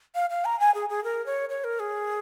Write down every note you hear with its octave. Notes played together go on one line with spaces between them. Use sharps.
F5
F5
A#5
G#5
G#4
G#4
A#4
C#5
C#5
A#4
G#4